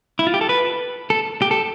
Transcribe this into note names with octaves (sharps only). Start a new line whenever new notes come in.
E4
F4
G4
A4
B4
A4
G4
A4